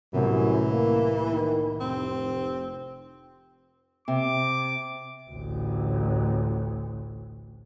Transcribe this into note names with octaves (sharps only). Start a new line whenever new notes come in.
C2 F#2 A2 C3 E3
A#3
D#3
F1 C4
C3 D6
A1 D2